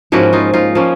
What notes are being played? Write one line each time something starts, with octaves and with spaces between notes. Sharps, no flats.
G#2 F3 A#3 C#4 E4 F#4
D#4 F4
D#4 F4
F3 A#3 C#4